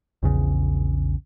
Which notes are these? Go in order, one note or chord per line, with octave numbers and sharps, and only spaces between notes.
A#1 E2 C#3